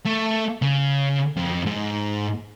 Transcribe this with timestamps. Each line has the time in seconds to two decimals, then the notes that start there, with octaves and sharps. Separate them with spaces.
0.05 A3
0.62 C#3
1.37 F2
1.67 G#2